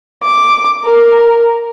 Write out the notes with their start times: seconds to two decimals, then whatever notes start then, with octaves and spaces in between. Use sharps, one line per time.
0.23 D6
0.84 A#4